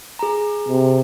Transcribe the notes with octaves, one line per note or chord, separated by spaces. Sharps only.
G#4 A#5
C3